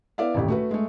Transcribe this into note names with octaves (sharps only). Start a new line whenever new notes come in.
B3 E4 D5 E5 F5
D#1 A1 G4
A3 F#4 B4
G#3 A3